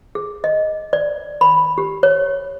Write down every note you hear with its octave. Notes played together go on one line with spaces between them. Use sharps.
G#4
D#5
D5
B5
G4
C#5